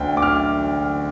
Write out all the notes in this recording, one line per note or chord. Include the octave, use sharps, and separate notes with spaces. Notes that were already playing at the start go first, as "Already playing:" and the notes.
Already playing: D2 G5
D6
F6